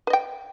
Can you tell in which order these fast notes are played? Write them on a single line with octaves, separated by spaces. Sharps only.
B4 D#5 G5